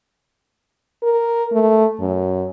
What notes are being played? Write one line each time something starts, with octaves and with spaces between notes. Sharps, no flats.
A#4
A3
F#2